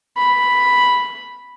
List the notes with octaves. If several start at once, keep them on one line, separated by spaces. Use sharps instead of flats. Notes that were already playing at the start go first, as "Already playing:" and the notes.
B5